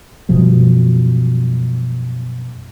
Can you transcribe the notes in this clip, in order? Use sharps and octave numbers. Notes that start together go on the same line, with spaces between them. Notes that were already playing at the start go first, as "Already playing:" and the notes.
F#2 B2 F3 G3